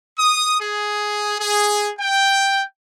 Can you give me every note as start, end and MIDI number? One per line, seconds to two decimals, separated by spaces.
0.19 0.60 87
0.61 1.35 68
1.39 1.90 68
1.99 2.62 79